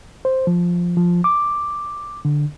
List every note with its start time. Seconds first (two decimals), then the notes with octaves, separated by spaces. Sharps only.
0.25 C5
0.47 F3
0.97 F3
1.24 D6
2.25 D3